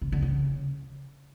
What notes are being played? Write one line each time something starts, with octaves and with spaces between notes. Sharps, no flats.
C#3
D3
C#3